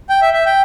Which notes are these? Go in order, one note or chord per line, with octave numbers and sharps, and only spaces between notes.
G5
E5
E5
G5